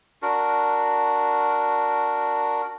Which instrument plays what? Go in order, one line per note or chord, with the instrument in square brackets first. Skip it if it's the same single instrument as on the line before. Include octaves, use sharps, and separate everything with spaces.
[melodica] D4 F#4 A#4